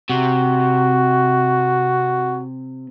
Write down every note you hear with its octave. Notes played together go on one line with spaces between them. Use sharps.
C3 F#4